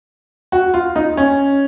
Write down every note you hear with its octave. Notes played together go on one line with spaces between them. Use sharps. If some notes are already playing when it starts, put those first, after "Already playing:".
F#4
F4
D#4
C#4